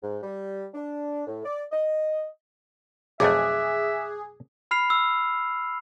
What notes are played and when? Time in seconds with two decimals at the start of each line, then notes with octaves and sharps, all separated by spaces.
0.02 G#2
0.23 G3
0.74 D4
1.27 A2
1.44 D5
1.72 D#5
3.20 B1 F2 A3 G#4 E5 D6 F#6
4.71 B5 F6 C7 F7
4.90 E6